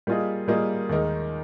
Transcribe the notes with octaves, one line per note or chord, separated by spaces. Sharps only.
G3 A#3 F4 G#4 D#5
G3 A#3 F4 G#4 D#5
D#2 D#3 G#3 D#4 A#4